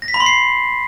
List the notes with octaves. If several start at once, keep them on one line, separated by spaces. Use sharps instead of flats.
A#6
B6
B5
C6
C7